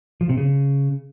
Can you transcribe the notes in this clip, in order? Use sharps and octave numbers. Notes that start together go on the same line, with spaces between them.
F3
C3
C#3